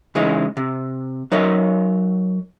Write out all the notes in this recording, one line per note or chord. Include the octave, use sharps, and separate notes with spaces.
C#3 E3 G#3 C#4 D#4 E4
C3
F#3 D#4 A#4 C#5 E5